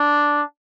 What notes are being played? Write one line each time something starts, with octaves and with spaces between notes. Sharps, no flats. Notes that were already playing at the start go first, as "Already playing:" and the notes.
Already playing: D4